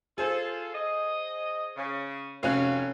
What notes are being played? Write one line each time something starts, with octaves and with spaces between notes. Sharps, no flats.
F4 G#4 A4 C5
D#5
C#3
F1 C#4 F#4 C#5 F5 F#6